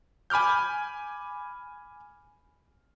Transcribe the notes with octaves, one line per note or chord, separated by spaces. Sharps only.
G#5 B5 D6 F6 G6